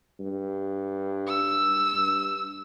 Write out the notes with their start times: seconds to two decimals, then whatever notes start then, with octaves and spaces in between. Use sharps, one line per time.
0.20 G2
1.28 E6
1.93 G2